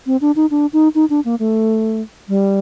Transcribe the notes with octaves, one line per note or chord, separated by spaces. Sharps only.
C4
D4
D#4
D4
D#4
D#4
D4
A#3
A3
G3